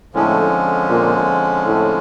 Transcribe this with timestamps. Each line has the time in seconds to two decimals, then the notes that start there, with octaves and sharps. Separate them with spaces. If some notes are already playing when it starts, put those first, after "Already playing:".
0.14 F2 A2 D3 F3 G#3 C#4
0.90 A#2
1.65 A2